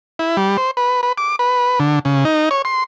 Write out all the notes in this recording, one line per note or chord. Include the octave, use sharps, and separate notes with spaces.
E4
G3
C5
B4
B4
D6
B4
D3
C#3
D#4
C#5
C6